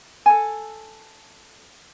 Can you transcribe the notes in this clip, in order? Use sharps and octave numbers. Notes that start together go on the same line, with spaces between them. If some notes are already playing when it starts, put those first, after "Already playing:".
A4 G#5